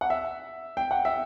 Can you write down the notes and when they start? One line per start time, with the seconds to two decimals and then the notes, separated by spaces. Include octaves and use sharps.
0.01 F#5
0.10 E5
0.77 G5
0.91 F#5
1.05 E5